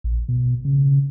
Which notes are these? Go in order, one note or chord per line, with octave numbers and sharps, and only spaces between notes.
A#1
B2
C#3